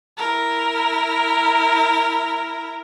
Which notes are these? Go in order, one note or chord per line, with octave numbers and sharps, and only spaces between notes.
E4 A#4